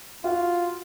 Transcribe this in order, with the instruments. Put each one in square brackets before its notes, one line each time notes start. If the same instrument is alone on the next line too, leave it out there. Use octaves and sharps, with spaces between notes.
[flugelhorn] F4 [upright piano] F#4